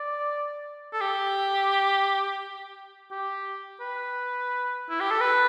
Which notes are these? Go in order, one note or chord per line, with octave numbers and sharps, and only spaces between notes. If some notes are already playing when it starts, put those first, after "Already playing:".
Already playing: D5
A4
G4
G4
B4
E4
G4
A4
B4